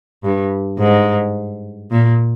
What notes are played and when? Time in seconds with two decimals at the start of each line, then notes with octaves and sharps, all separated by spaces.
0.24 G2
0.79 G#2
1.91 A#2